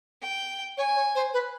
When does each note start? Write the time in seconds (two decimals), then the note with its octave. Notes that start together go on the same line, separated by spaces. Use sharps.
0.22 G5
0.78 C#5 G#5
0.96 C#5
1.15 C5
1.33 B4